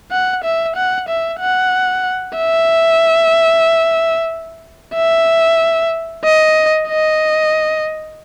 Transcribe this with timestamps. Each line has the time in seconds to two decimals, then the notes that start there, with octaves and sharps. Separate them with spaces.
0.11 F#5
0.44 E5
0.76 F#5
1.09 E5
1.40 F#5
2.37 E5
4.95 E5
6.24 D#5
6.88 D#5